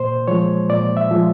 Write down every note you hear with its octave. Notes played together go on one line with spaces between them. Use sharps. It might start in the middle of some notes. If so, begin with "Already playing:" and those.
Already playing: A#2 C5
F3 G#3 C#5
A#2 D5
E5
F3 G#3